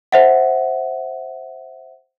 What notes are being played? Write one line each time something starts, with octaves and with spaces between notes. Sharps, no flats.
C5 E5 F#5